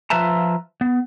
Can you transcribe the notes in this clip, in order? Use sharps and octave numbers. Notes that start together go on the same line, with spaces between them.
F3 F4 B4 E5 A5 A#5
B3